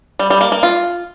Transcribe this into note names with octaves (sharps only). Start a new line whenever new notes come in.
G3
G3
A#3
A#3
F4